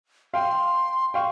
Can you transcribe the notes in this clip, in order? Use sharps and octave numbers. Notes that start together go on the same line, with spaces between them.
F5 G5 C6
F5 G5 C#6